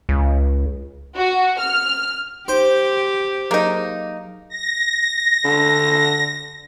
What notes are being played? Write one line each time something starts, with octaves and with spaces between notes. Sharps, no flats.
C#2
F#4
F6
D#4 G4 C5
F#3 A#3 D#4 G#4 G6
A#6
D3